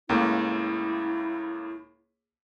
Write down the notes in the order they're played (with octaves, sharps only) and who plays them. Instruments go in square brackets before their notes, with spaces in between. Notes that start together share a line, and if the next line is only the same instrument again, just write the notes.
[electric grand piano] C#2 A2 A#3 [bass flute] E4